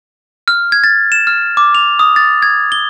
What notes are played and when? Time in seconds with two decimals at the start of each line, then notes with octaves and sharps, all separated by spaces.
0.48 F6
0.72 G#6
0.84 A6
1.12 E7
1.27 F6
1.57 D6
1.75 F7
1.99 D#6
2.16 A6
2.42 G#6
2.72 G7